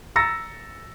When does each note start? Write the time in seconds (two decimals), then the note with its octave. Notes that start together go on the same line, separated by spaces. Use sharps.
0.16 A#5 E6 A6 A#6 C#7